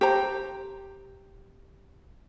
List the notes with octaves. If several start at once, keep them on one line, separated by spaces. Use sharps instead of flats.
G4 C5 A#5